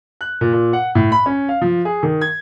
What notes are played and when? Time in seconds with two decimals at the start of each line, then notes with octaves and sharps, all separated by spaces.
0.21 F#6
0.41 A#2
0.53 A#2
0.73 F#5
0.95 A2
1.12 B5
1.26 C#4
1.49 F5
1.62 F3
1.85 G#4
2.03 D#3
2.21 G#6